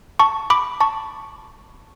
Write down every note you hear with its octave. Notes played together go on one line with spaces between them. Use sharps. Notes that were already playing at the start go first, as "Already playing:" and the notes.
A5 C#6
B5 D6
A5 C#6